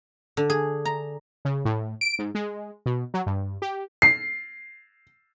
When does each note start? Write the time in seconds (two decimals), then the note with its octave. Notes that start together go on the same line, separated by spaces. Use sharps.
0.37 D3
0.50 G#4
0.85 A#5
1.45 C#3
1.65 A2
2.01 D7
2.19 G#2
2.35 G#3
2.86 B2
3.14 F#3
3.26 G2
3.62 G4
4.02 C7